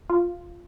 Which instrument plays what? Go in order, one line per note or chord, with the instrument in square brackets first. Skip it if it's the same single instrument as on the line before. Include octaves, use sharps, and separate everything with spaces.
[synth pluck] F4